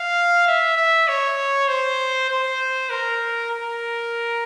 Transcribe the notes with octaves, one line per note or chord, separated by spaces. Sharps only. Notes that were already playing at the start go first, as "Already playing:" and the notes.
Already playing: F5
E5
E5
C#5
C5
C5
A#4
A#4